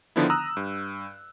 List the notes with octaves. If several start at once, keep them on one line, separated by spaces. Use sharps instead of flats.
D3 D#3 F3 B3 D4 E4
A#5 D#6 E6 F#6
G2